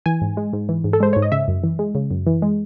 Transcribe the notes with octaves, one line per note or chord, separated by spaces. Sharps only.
E3 G#5
G#2
G#3
G#2
E3
G#2
A4
G#3 C5
G#2 C#5
D#5
C#3 E5
F#2
E3
G#3
C#3
F#2
E3
G#3